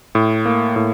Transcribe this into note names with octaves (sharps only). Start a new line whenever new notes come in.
A2
A#3
A2